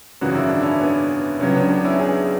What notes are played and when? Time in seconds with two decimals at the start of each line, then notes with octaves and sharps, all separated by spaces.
0.21 G#1 F#2 C#3 E3 F#4
0.35 E4
0.49 D4
0.62 C#4 E4
0.81 B3 D4
1.39 C#2 C#3 F#3 C#4
1.54 B3 D4
1.69 B3 D4
1.84 C#4 E4
1.99 E4 G#4